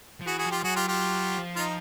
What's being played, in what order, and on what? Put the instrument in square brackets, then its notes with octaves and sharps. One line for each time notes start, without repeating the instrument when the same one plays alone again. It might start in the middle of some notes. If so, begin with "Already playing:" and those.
[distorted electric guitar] F3
[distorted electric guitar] E3 [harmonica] F#4 G#4
[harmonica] F#4 G#4
[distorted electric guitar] F3
[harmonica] F4 G4
[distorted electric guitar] F#3 [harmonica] F#4 G#4
[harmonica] F4 G4
F4 G4
[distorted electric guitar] F3
[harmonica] D#4 F4